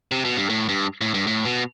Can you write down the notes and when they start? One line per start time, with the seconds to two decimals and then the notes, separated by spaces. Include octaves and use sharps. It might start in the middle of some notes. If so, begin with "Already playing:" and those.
0.12 C3
0.25 B2
0.37 G2
0.49 A2
0.69 G2
1.01 A2
1.14 G2
1.27 A2
1.45 B2